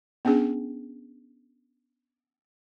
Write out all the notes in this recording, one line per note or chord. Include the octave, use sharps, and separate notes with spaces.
B3 C#4 D4 G#4